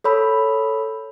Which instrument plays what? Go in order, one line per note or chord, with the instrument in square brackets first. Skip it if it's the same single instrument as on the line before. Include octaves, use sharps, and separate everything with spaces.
[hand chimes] A4 C#5 B5 E6